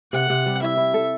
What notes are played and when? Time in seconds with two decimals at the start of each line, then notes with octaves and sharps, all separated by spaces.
0.13 C3 F#5
0.30 C3
0.46 G3
0.62 E4 E5
0.77 E4
0.94 A4